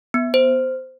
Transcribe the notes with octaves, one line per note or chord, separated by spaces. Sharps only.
B3
C5